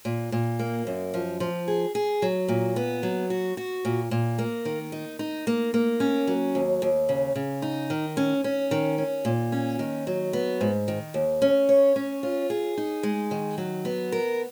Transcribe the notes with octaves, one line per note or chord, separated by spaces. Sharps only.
A#2
A#2
A#3
F#2
F3
F3
G#4
G#4
F#3
A#2
B3
F#3
F#4
F#4
A#2
A#2
A#3
D#3
D#4
D#4
A#3
A#3
C#4
F#3
D#2
D#2
C#3
C#3
D#4
D#3
C#4
C#4
D#3
C#4
A#2
C#4
D#3
F#3
B3
G#2
D#3
D#2
C#4
C#5
C#4
F4
G#4
D#4
G#3
D#3
F#3
B3
A#4